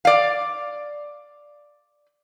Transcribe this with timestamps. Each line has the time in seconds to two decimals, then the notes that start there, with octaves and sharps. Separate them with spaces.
0.05 D5 F5